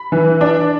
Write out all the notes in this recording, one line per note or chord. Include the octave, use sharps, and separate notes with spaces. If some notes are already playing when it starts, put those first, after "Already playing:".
Already playing: B5
E3
D4